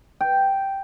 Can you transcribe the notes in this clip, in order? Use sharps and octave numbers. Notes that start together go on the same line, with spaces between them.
G5